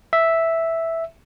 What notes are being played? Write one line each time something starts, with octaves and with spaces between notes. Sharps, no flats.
E5